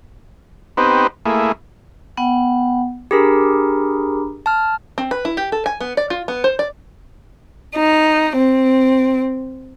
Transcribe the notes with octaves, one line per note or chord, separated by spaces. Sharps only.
B3 C4 D#4 G4 B4 C5
A3 A#3 E4 G#4
B3 F#5 G5
D4 G4 G#4 A#4 A#5 B5
A5 F6
C4
B4
E4
G4
A4
G#5
B3
D5
F4
B3
C5
D5
D#4
C4